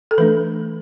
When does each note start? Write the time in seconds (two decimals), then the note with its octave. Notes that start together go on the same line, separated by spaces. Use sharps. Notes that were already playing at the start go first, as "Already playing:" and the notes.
0.11 A4
0.18 E3 A3 D4 B4